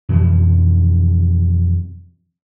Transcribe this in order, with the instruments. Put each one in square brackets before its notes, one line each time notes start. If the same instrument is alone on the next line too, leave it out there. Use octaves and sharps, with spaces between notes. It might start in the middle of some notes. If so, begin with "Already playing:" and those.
[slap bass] F2 B2 E3 F3